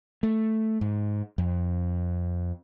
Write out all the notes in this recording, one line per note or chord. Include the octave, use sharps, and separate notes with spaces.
A3
G#2
F2